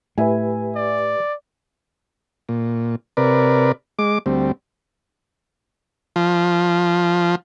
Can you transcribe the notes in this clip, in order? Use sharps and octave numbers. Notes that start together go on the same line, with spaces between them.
A2 G4 B4 E5 G#5
D5
A#2
C3 A#4 B4 D5
G#3 D6
D2 G3 C4
F3